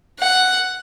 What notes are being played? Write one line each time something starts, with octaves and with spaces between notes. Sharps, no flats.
F#5